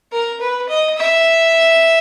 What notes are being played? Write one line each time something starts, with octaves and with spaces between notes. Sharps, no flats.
A#4
B4
D#5
E5